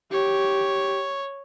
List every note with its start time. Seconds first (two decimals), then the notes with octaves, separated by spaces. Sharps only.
0.12 G4 C#5